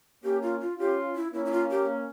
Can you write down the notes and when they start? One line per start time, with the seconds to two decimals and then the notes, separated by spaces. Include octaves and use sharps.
0.24 A#3 C#4 G4
0.42 F4
0.61 F4
0.78 C#4 F4 G4
1.15 E4
1.33 A#3 C#4 E4
1.45 E4
1.51 F4
1.70 G4